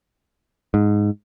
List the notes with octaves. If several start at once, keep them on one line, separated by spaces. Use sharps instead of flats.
G#2